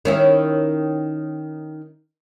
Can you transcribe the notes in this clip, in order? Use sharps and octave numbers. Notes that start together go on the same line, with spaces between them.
D#3 C#4 E4